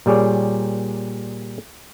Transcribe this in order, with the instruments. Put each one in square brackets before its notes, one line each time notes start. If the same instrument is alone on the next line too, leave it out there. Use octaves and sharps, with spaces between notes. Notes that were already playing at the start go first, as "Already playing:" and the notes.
[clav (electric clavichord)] A#2 G3 G#4 C#5 D5